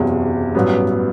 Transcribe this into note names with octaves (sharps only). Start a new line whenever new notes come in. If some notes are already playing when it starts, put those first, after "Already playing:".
Already playing: F#1 E2 C3 F#3
A1 G2 F#3 B3